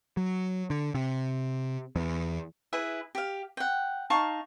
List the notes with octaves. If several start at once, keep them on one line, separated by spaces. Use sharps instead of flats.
F#3
D3
C3
E2
E4 G#4 B4 E5
G4 F5
F#5 G5
D#4 F5 A5 C#6